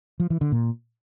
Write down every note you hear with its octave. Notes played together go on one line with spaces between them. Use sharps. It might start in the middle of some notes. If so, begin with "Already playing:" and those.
F3
E3
D3
A#2